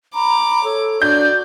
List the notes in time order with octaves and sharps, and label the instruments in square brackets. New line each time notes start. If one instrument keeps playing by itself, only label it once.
[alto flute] A#5 [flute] B5 [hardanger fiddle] D6
[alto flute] A4 [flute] C#5
[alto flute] D4 [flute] F#4 [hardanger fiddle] D5 [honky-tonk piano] G6